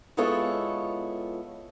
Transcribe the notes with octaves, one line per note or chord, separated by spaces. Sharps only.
G#3 B3 E4 F4 A4 C#5